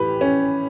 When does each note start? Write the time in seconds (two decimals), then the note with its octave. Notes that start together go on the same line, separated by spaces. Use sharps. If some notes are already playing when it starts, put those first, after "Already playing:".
Already playing: A2 E3 G4 B4
0.21 C#4